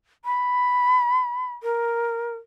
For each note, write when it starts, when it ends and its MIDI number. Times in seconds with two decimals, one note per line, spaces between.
0.25 1.53 83
1.63 2.34 70